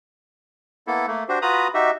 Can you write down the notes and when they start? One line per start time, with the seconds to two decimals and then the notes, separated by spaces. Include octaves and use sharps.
0.87 A#3 B3 E4 A4
1.07 A3 A#3
1.29 D4 F#4 G4 C5
1.42 F4 F#4 B4 A#5 B5 D#6
1.74 D#4 F#4 G4 E5